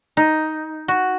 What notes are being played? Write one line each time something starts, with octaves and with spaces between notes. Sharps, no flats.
D#4
F#4